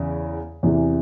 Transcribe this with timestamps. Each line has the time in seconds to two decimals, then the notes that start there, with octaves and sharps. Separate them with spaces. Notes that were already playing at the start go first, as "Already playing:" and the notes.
Already playing: E2 C#3
0.63 E2 C3 E3